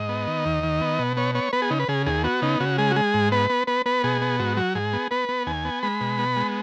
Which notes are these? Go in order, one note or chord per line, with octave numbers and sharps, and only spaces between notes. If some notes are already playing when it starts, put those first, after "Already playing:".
Already playing: G#2 D#5
B3
D#3
D#2
D#3
B3
B2
B3 C#5
B3 C#5
B3 B4
G#4
C#3 D#4
B4
C#3 G#4
D#2 G#4
B3 F#4
C#3 D#4
C#3 F#4
G#3 G#4
F#4
G#3 G#4
G#2
B3 B4
B3
B3 B4
B3 B4
B2 G#4
B3
G#2 F#4
F#3 F#4
G#2 G#4
B3
B3 B4
B3
D#2 G#5
B3
G#3 B5
B2
B3
G#3